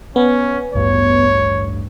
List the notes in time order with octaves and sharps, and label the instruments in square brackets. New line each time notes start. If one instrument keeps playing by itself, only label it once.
[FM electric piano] B3 [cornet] C#4
[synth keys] A1 D2 G2 [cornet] C#5